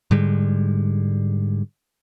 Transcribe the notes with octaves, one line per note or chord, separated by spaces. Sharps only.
G#2 D3 G3 G#3